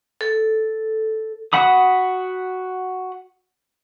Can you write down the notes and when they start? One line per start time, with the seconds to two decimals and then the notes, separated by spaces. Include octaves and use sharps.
0.21 A4
1.53 F#4 F#5 B5 D#6